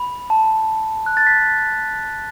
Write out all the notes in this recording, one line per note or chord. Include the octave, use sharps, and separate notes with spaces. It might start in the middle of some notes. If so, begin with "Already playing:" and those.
Already playing: B5
A5
F#6
A6
B6